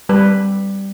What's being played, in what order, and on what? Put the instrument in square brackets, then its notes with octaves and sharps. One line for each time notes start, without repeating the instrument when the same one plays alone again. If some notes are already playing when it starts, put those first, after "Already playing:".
[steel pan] G3 B4